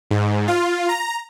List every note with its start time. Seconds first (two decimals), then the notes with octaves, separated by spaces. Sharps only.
0.11 G#2
0.48 F4
0.89 A#5